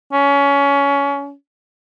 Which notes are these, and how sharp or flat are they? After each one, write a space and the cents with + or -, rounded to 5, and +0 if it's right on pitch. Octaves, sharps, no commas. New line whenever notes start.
C#4 +25